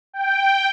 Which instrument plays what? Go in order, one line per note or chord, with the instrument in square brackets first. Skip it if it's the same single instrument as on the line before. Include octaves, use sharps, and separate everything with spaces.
[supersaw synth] G5